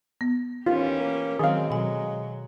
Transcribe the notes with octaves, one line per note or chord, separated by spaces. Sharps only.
B3
D#2 E3 C#4 F4 G4
A#3
D#3 F#3 G#3 C4 G#4 F5
B2 F#3 G#5